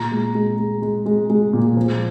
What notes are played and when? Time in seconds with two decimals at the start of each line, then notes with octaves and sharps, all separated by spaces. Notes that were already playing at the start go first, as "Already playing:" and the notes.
Already playing: A#2 A#5
0.12 G#3
0.35 G#3
0.58 G#3
0.82 G#3
1.06 G#3
1.30 G#3
1.53 A#2
1.77 F3